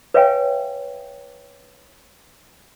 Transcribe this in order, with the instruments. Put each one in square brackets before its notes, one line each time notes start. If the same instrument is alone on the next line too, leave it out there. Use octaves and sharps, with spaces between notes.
[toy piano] B4 C#5 E5 F5 G5 G#5